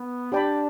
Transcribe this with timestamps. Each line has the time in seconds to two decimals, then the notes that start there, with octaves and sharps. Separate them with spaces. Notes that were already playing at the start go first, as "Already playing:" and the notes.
Already playing: B3
0.32 D4 G4 D5 G5 B5